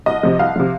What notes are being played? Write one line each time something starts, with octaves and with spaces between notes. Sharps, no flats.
C2 D#5
C3 F3
C2 F5
C3 F3